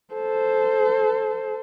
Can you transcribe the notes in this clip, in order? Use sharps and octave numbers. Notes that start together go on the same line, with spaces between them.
A4 C5